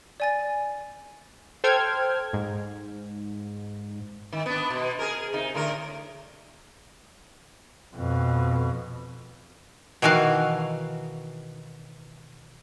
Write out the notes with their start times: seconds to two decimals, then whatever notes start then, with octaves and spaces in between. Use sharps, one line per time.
0.20 D5 G#5 A6
1.64 A4 C5 G5 F6 G#6
2.33 G#2
4.33 D#3
4.46 B3 D4
4.70 B2
4.99 G#4 A#4
5.33 C3 D#4
5.55 A2 D3 A#4
7.96 F2 B2
10.02 B2 D#3 E3 F#4 F5